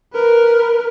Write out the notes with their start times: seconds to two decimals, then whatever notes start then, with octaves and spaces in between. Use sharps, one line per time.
0.14 A#4 B4